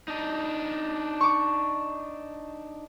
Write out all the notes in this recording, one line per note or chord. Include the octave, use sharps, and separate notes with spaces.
D4 D#4
C#6 D6